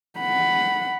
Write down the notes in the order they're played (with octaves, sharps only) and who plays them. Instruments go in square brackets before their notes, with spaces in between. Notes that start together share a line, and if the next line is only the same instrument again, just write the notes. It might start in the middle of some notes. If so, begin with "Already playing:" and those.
[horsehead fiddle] F#5 B5